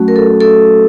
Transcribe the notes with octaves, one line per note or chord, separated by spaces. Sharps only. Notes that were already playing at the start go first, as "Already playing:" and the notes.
Already playing: F#3 A3 C#4 F#4
A#4
A4
A4